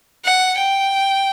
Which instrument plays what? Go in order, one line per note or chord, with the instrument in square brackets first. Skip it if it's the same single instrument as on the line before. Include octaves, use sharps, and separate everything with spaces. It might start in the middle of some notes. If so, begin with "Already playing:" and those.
[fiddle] F#5
G5